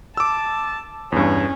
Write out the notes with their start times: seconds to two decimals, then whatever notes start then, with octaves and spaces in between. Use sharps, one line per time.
0.17 A5 D6 E6
1.12 E2 G2 C#4